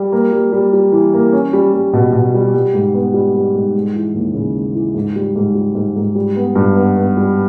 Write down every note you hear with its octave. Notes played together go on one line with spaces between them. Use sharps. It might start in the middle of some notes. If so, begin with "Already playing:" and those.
Already playing: G3
A#3
G3
G3
G3
E3
A#3
C#4
G3
G3
B2
B2
G3
G3
G#2
B3
G3
G3
G#2
G#3
E3
D#2
C#3
G#3
E3
G#2
G3
G#2
G3
G#2
G#2
G3
B3
G2
B3
B3
G3